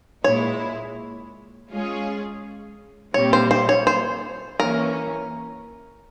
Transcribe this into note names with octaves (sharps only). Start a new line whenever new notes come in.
A#2 G#3 E4 C#5
G#3 C#4 F4 G#4
A#2 G3 C4 G4 C#5
C5
C5
C#5
C5
E3 A#3 C#4 A#4